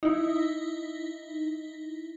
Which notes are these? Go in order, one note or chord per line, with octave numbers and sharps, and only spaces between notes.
D#4 E4